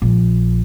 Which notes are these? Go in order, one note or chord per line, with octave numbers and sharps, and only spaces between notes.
A#1